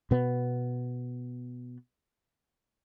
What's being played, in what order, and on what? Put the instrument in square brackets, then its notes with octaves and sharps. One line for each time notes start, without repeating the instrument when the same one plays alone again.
[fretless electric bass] B2 B3